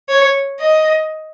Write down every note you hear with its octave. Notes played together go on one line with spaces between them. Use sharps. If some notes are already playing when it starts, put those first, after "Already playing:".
C#5
D#5